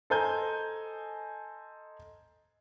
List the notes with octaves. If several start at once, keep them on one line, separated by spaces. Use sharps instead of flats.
A4 C5 D#5 G#5 A#5 G6